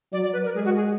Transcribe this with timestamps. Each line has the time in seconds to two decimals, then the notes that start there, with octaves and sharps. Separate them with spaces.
0.12 F#3 D5
0.23 D5
0.33 B4
0.45 A#4
0.55 G#3 G#4
0.65 F#4
0.76 G#4